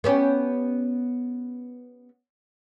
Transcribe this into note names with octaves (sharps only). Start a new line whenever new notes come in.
B3 C#4 G4